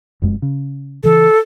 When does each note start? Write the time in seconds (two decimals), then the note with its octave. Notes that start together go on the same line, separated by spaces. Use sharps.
0.22 F1 F#2 G#3
0.42 C#3
1.04 C#3 E3 A4